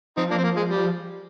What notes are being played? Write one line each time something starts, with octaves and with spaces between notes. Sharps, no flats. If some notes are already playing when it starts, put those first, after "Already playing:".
F3 C4 D#4
A#3 D4
C4
A#3
G#3
G3